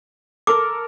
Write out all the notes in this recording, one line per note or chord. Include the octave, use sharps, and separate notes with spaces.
A4 A#4 D6